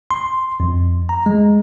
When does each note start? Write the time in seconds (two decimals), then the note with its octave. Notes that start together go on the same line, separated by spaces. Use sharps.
0.11 C6
0.60 F2
1.09 A#5
1.26 G#3